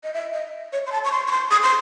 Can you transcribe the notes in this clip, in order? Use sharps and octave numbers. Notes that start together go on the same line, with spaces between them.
D#5
E5
D#5
C#5
C6
A5
C#6
C6
C#6
C6
D#6
C6